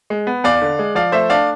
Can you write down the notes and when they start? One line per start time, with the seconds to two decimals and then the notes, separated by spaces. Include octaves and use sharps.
0.10 G#3
0.27 B3
0.44 E2 D5 F5
0.62 D3
0.79 G#3
0.95 F3 D5 F5
1.12 A3 C5 E5
1.30 D4 D5 F5